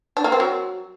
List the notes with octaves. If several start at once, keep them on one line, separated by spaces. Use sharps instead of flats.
D4
A#3
C4
F#3